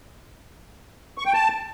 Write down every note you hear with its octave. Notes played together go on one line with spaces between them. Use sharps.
C#6
G5
A5